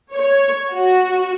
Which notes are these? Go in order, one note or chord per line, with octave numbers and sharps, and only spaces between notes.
C#5
F#4